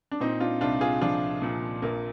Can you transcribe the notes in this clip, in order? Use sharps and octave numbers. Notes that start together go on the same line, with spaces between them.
D4
A#2 C4 D#4
D4 F4
C2 D4 F4
F4 G#4
F3 D4 F4
A#2
A#1 A#3